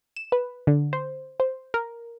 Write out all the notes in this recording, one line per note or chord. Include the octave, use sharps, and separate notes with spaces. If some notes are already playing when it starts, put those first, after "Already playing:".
E7
B4
D3
C5
C5
A#4